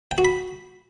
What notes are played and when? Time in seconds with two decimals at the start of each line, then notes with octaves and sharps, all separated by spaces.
0.11 G5
0.18 F#4
0.25 B5